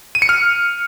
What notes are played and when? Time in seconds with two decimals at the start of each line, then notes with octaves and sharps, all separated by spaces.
0.15 D#7
0.22 C#7
0.29 F6